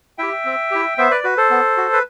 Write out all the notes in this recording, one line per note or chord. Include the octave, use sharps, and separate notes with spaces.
E4 G4 E5 G5
C4
E4 G4
B3 C5 E5
B4 D5
F#4 B4
A4 C5
B3
F#4
B4